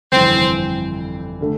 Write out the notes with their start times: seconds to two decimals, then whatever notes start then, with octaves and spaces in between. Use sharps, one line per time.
0.12 G1 F2 C3 E3 C4
1.41 D3 A3